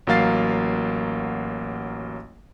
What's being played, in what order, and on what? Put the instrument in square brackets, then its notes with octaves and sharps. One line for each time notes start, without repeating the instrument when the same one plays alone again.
[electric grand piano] A1 F#3 A#3 F5 A6 C7